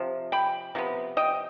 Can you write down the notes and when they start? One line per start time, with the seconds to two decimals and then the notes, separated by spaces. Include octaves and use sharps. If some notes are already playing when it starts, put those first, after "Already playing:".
Already playing: C3 F3
0.32 G5 B5
0.75 C3 F3 B3
1.17 D#5 G5